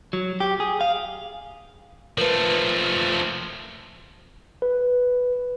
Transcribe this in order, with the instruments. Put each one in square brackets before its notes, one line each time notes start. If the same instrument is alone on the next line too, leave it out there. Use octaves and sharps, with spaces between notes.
[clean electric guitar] F#3
G4
G#4
F5
[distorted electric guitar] F3 A3 [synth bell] A#4 B4
[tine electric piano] B4